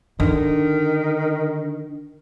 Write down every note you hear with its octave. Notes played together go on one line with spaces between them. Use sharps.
D3 D#3